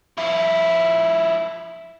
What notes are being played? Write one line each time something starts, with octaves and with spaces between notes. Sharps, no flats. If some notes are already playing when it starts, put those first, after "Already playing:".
F3 E4